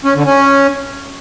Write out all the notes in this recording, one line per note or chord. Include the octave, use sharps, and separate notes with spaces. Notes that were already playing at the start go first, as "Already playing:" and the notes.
C#4
D3
C#4